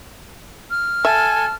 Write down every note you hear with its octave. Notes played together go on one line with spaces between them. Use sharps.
F6
A4 E5 G#5